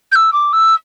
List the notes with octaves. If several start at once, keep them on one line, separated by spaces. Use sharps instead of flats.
G6
E6
D6
E6